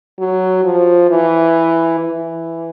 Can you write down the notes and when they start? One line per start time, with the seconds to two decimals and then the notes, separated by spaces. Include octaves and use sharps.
0.19 F#3
0.64 F3
1.10 E3
1.99 E3